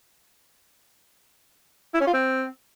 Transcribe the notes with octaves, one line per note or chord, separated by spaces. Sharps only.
E4
C#4
F4
C4